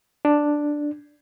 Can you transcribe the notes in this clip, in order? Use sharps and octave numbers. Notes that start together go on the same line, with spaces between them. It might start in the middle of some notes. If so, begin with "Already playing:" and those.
D4